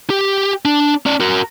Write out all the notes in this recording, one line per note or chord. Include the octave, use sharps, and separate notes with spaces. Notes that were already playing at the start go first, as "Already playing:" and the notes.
G4
D4
C#4 D5
F#4 A#4